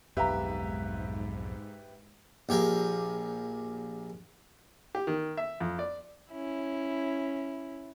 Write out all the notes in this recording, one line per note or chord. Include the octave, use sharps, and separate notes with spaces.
B1 F2 G#2 G4 B4 E5 F5 A#5
A#1 G4 G#4 A#4
G4
D#3
E5
F2
D5
C#4 E4